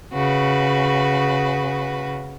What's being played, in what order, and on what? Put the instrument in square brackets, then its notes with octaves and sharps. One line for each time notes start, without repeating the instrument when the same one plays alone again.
[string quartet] C#3 F#4 B4